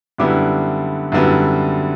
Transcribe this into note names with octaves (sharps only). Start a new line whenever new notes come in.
F#2 D3 G3 B3 E4 D6
F#2 D3 G3 B3 E4